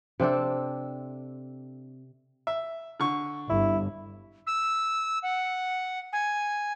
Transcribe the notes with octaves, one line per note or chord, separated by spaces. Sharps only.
C3 C4 D4 A4
E5
D3 C#6
G1 E4
E6
F#5
G#5